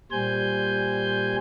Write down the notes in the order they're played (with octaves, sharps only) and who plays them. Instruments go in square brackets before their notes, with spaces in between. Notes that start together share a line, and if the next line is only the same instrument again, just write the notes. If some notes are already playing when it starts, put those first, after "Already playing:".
[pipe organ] A#2 G3 C5 G#5 G6